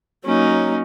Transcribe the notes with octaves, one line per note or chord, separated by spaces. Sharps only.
F#3 A#3 C#4 D#4